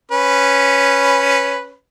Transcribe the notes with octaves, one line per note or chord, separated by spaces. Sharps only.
C#4 B4